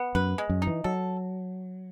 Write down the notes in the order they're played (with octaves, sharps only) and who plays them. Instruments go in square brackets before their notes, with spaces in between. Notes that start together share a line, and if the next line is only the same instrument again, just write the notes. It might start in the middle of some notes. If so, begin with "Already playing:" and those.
Already playing: [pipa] B3
[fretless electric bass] F#2 [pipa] B4
[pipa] G#3
[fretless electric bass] F#2
[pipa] D#4
[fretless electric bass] E3
[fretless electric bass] F#3 [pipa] A4